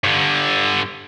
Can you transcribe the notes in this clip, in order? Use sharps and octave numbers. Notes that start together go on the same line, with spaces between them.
G2 D3